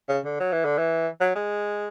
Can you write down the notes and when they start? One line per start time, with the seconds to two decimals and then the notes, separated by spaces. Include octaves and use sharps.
0.09 C#3
0.25 D3
0.40 F#3
0.52 E3
0.65 D3
0.78 E3
1.21 F#3
1.35 G#3